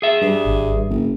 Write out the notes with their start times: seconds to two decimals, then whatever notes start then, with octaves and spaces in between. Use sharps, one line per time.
0.02 G#4 E5
0.21 G2
0.45 G#1
0.90 F#1